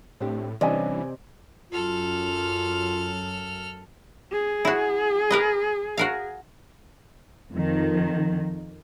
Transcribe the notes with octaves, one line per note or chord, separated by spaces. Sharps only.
A2 C4 D4 G4
C3 E3 G3 C#4 D4 D5 D#5 G#5
F#2 F4 A4 F6
G#4
E4 F#4
A#4 B4 D#5
F#4 A#4 F5
F2 D#3 F3